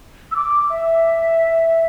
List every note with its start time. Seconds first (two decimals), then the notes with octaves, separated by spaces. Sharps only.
0.31 E6
0.36 D6
0.70 E5